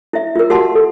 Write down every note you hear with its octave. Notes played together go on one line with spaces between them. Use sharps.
E4 E5
F4 A#4
F#4 G4 F#5 A5 C6
A4